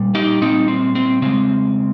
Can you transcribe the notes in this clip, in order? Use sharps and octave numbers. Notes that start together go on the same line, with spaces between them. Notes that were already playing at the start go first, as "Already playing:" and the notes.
Already playing: A#2 G3
D#4 G4
A#2 G3 C4 D#4
C4
C4
C#3 G#3 C4